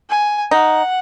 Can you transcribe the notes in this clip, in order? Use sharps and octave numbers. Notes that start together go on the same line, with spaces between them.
G#5
D#4 F#5